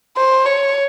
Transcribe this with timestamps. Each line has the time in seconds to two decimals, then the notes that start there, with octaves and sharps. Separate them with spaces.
0.17 C5
0.45 C#5